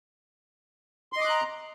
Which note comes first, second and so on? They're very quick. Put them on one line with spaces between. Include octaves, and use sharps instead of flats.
C6 D#5 D6 F#6 A#5